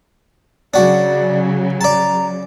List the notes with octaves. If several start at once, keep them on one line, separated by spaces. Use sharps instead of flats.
C#3 F#3 D4 F#4 D5
D5 A5 A#5